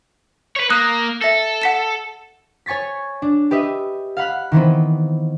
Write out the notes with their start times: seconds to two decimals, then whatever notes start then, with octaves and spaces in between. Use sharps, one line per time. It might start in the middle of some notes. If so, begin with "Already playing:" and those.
0.56 B4 C#5
0.70 A#3 D#6 F#6
1.22 A4 E5 A#6
1.62 F#5 B6 E7
2.66 C#5 G#5 C#6 A6 B6
3.22 D4
3.51 G4 B4 D#5 E5
4.17 F5 F#5 B5 F#6
4.52 D#3 E3 B3 C4